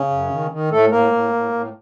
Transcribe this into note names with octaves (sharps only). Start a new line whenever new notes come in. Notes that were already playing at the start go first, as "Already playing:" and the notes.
Already playing: C#3 C#4
F#2
D#3
D#3
A2 A3 A4
A2 A#3 A#4
A2
A2
A2